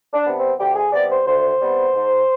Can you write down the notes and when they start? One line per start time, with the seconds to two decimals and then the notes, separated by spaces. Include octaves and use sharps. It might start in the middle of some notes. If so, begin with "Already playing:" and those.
0.13 D4
0.25 C3 G3 B3
0.36 C4
0.59 D2 G4
0.75 G#4
0.92 C3 G3 B3 D5
1.10 C5
1.26 D2 C5
1.61 C3 G3 B3
1.94 G#2